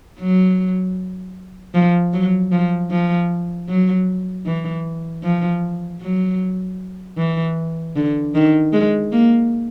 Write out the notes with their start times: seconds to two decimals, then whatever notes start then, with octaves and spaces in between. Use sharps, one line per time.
0.19 F#3
1.74 F3
2.13 F#3
2.52 F3
2.91 F3
3.69 F#3
4.46 E3
5.23 F3
6.01 F#3
7.17 E3
7.96 D3
8.35 D#3
8.73 G#3
9.12 A#3